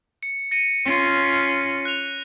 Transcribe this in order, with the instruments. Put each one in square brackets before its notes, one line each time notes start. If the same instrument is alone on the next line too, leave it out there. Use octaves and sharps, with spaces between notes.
[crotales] C#7
A#6 C#7 D#7
[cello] C#4 F4
[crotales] F#6 F7